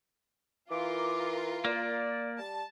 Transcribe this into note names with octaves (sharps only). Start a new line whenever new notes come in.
E3 F4 A#4 D6
A#3 D5
G3 A5